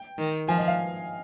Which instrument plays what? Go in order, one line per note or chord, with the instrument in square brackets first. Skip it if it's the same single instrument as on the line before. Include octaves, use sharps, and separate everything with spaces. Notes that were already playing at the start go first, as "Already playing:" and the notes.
Already playing: [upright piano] G5
[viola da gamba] D#3
[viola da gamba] F3 [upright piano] G#5
[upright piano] D#5
F5